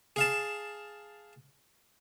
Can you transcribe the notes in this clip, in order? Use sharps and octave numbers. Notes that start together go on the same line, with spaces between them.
G#4 F5 A5